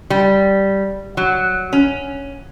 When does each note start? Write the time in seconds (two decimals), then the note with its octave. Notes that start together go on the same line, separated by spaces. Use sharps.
0.10 G3
1.17 F#3
1.73 C#4